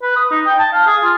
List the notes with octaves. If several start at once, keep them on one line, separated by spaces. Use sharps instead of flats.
B4
D#6
D#4
G5
A5
F5
G#4
F4